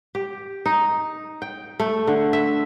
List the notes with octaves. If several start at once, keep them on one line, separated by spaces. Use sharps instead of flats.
G4
D#4
G5
A3
D3
E5